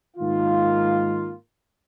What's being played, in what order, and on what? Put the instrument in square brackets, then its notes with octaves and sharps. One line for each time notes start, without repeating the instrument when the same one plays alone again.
[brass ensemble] G#2 D#3 A#3 F4